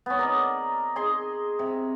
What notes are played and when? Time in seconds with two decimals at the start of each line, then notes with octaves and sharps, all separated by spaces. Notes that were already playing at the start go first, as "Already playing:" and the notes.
0.06 B3 C#4
0.18 A#4 D5 D#5
0.96 G#4 D#5 C6
1.59 C3